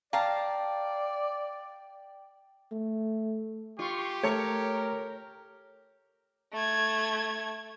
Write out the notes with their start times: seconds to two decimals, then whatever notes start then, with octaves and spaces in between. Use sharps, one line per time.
0.13 D5 F5 G5 A5 A#5
2.72 A3
3.79 F4 G4 C6 C#6
4.23 A3 A4 A#4 C#5 A#5
6.53 A3 G#6